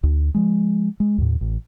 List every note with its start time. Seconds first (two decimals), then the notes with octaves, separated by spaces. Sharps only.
0.03 D2
0.34 F3 G#3
1.00 G#3
1.18 D#2 A2
1.41 A1